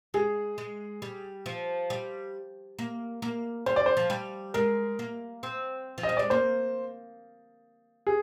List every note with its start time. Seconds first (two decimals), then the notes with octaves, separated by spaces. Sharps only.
0.14 G#3 G#4
0.58 G#3
1.02 G3
1.46 F3
1.90 G3
2.79 A#3
3.22 A#3
3.66 G3 C5
3.76 D5
3.86 C5
3.97 F3
4.10 G3
4.54 G#3 A#4
4.99 A#3
5.43 C4
5.98 F3
6.03 D#5
6.09 G3
6.17 G#3 D5
6.30 A#3 C5
8.07 G#4